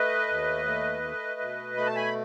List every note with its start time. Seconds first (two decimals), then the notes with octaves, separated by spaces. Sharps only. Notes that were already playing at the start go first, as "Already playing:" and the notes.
Already playing: A3 B4 D#5
0.28 D#2
0.65 A3
1.03 A3
1.40 B2
1.77 A3 B5
1.86 A5
1.96 G#5 B5